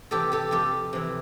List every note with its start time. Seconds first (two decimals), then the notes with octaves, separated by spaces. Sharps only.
0.11 C3 E3 G4 A4
0.32 G4 A4
0.51 F2 G4 A4
0.93 C3 E3